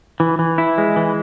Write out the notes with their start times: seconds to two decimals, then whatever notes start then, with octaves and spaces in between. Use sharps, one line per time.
0.20 E3
0.39 E3
0.58 E4
0.78 G#3
0.96 E3